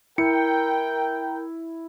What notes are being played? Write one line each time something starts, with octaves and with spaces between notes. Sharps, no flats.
E4 A#4 G5 C#7